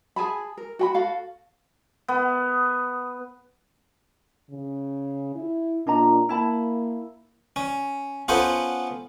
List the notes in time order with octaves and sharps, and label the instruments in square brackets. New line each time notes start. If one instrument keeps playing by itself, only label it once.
[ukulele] G#4 G#5 A5 B5
A#4
F#4 G5 B5
F#4 A4 F5
[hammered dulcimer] B3
[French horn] C#3
E4
[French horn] A#2 [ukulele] D4 D#5 A#5
[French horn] A#3 [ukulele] E4 A5 B5
[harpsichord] C#4
B3 C#4 F4 A4 C5 F#5